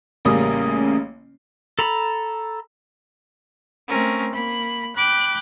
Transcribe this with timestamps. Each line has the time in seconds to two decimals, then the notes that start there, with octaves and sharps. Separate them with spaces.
0.25 A1 C#3 G3 A#3 C#4 D#6
1.79 A4 A#5 B5
3.89 A3 C4 C#4 A#4
4.32 A#3 B5
4.95 G5 B5 D6 F#6